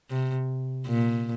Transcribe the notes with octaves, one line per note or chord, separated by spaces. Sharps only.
C3
A#2